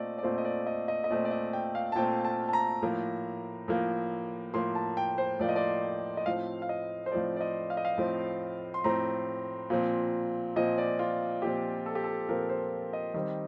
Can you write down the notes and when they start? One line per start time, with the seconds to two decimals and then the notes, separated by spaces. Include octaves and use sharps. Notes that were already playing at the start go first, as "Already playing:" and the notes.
Already playing: A#2 A3 C4 D5 D#5
0.18 D5
0.23 A#2 A3 C4 C5
0.38 D#5
0.45 D5
0.67 D#5
0.88 D#5
1.04 D#5
1.10 A#2 A3 C4 D5
1.25 D5
1.31 D#5
1.53 G5
1.75 F5
1.92 A5
1.95 A#2 A3 C4 G5
2.24 A5
2.49 A5
2.53 A#5
2.82 A2 F3 A#3
3.68 A2 F3 A#3
4.54 A2 F3 A#3 C6
4.75 A5
4.97 G5
5.18 C5
5.40 A2 F3 A#3 D5
5.49 D#5
5.56 D5
6.17 D#5
6.26 A2 F3 C4 F5
6.62 F5
6.69 D#5
7.06 C5
7.12 A2 F3 C4 D5
7.36 D5
7.41 D#5
7.70 F5
7.77 D#5
7.85 F5
7.98 A2 F3 C4
8.74 C6
8.84 A2 F3 C4 A#5
9.70 A#2 F3 C4
10.56 A#2 F3 C4 D#5
10.78 D5
10.99 F4
11.42 A#2 F3 C4 G4
11.86 A4
11.95 G4
12.04 A4
12.29 A#2 F3 C4 A#4
12.49 C5
12.93 D#5
13.14 D#3 G3 C4 D#5